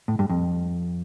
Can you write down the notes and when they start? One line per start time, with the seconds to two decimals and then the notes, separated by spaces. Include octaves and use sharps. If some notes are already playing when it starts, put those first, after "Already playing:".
0.08 A2
0.19 G2
0.30 F2